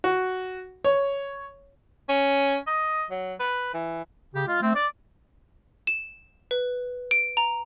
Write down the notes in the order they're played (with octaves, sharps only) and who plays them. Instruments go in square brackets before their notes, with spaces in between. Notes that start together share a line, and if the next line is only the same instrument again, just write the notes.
[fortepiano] F#4
C#5
[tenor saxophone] C#4
D#5
F#3
B4
E3
[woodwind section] C#3 G4
G#3 F4
A3 C4
D5
[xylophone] E7
B4
D7
A#5